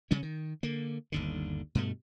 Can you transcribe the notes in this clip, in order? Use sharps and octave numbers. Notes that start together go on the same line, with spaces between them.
C#3 G3 C#4
D#3
D3 A#3
G1 D#2 D3
G2 B2 A3